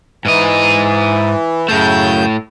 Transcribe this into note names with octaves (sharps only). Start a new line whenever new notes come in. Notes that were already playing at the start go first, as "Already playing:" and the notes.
G#2 E3 D#5
F#2 A2 C#3 A3 G6